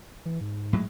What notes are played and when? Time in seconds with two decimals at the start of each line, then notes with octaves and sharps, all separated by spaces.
0.25 E3
0.41 G#2
0.73 A2 F#3 G#3